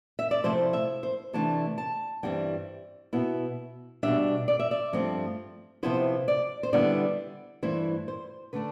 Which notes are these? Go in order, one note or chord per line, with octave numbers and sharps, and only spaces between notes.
E5
D5
C3 F3 A3 E4 C5
E5
C5
C3 E3 A3 D4 A5
A5
G2 E3 G3 C4 E4 G5
B2 B3 E4
B2 G3 D4 E5
D5
E5
D5
G2 F3 A3 C4
C3 F3 B3 E4 C5
D5
C5
D3 G3 B3 E4 D5
G2 E3 A3 E4 C5
C5
D3 A3 D4 B4